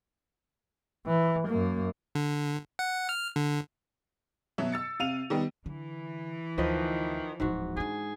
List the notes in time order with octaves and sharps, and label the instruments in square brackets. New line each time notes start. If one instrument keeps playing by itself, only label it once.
[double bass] E3
F#2 A#3
[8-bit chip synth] D3
F#5
F6
D3
[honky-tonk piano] B2 F#3 E5
E6 A6 C#7
C3 F5 D#7 F7
D#3 G3 B3
[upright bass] D3 [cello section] E3
[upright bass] D2 [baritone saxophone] D#3 [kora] F3 B4 D#5
[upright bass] D1 F3 [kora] G#2 F#4
[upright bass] G#3 D4 [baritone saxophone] G#4